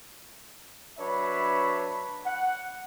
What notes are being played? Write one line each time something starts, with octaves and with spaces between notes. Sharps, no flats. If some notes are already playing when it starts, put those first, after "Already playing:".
F#3 D4 B4 C#5 E5 B5
F#5